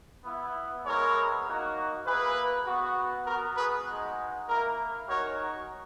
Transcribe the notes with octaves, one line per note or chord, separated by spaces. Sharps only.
B3 E4
G#3 B3 E4 A#4 C#5
A#3 D#4 F#4
A#3 E4 G#4 B4
B3 F#4
B3 F#4 A#4
G#4 B4
G#3 D#4 F#4
A#3 E4 A#4
G#3 D#4 F#4 A#4 C#5